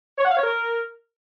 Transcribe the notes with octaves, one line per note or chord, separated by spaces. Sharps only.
C#5
F#5
F5
C#5
A#4